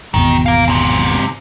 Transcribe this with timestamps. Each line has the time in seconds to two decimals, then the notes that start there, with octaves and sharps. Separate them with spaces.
0.14 G#1 E2 B2 D#3
0.46 A#4 F5
0.68 G#2 C3